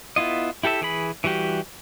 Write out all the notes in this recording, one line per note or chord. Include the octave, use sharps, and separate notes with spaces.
B3 E4 F4 D#5
E4 G4 A4 E5
E3 G#4 B5
E3 G3 F#4 G4